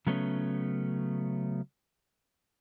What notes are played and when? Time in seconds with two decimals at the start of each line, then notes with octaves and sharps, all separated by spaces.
0.07 C#3 F#3 A3 B3 C#4